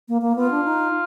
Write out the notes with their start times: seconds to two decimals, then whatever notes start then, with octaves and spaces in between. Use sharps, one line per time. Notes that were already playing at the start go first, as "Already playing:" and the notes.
0.08 A#3
0.22 A#3
0.36 B3 F4
0.50 D4
0.64 D#4